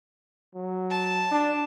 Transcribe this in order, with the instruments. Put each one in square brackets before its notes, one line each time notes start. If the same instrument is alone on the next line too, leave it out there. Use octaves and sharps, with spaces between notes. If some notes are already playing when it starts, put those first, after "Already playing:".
[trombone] F#3
[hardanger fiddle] A5
[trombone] D4